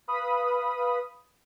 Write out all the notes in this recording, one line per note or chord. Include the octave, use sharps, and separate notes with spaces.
B4 F5 B5 D#6